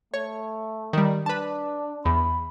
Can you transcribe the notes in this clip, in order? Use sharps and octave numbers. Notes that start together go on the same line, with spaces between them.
A3 C#5
D#3 G3
D4 B4 A5
E2 B5